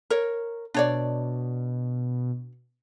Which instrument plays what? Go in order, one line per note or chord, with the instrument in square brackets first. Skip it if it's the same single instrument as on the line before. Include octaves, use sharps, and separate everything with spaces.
[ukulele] A#4 C#5
[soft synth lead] B2 [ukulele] D4 C#5 D5